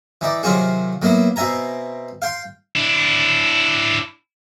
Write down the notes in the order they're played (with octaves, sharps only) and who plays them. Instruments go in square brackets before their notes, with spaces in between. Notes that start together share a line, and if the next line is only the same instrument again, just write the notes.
[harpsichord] E3 D#4 D5
C3 D#3 F#3 F4 F#4 G#4
F#3 A#3 B3 E4
B2 C4 E5 G#5 A#5
F5 G5 C6
[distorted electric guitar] D4 E4